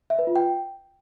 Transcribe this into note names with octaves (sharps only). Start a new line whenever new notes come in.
E5
B4
F4
G5